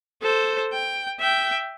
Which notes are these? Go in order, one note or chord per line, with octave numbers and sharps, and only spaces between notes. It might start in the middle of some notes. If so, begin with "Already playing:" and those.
A4 C5
G5
E5 G5